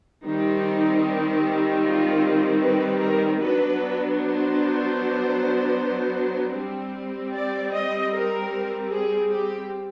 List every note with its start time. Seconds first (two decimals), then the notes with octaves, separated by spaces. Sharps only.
0.24 D#3 G3 C4 D#4
1.82 F4
2.61 B4
3.00 A#4
3.39 F#3 B3 D4 B4
4.18 C5
6.55 G3 C4
7.33 D5
7.73 D#5
8.12 A#4
8.90 G#4
9.30 G4